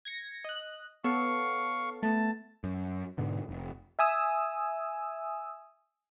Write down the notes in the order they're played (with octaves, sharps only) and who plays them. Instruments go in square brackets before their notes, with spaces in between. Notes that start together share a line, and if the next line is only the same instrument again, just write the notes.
[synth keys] G#6 A#6 C#7
D#5 F#6
[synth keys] B3 A4 C#5 [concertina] F5 C#6
[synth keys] A3 B3 [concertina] A5
[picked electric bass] F#2
G#2 B2 D3
F1
[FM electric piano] E5 G#5 D#6 E6